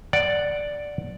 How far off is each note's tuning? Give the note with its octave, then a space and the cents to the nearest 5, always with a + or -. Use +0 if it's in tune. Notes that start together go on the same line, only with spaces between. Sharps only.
D5 +0 F#5 +0